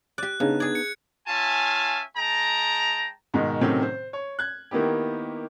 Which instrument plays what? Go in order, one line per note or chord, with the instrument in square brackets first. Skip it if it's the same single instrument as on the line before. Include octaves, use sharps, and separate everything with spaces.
[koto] G4 D5 [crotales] F#6
[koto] C#3 [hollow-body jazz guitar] B3 D4 D#4
[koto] G#4 D5 [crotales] G#6
[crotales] C#7
[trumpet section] C#4 F4 E5 F5 G#5 A5
G#3 G5 A5 A#5
[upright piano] G#2 B2 D#3 G#3
A2 C3 D#3 F#3 C4 C#4
C5
C#5
F#6 G#6
D#3 A#3 B3 E4 G4